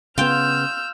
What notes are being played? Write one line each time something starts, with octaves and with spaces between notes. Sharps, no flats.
C#3 B3 F4 G5 E6 F6 G6